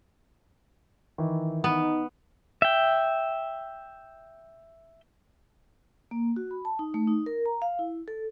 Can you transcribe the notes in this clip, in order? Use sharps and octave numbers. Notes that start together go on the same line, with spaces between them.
D#3 E3
B3 D#4
E5 G5
A#3
F#4
B5
A5
D#4
A3
D#4
A#4
A#5
F5
E4
A4